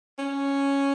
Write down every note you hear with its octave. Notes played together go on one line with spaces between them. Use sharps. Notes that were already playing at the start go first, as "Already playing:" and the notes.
C#4